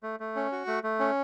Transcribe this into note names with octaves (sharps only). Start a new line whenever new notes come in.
A3
A3
C#4
F#4
A3
A3
C#4